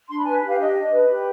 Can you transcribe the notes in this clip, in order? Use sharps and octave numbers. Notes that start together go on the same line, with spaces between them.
D4 C6
B5
B4 G#5
G4
F5
D4 D#5
D4
B4
G4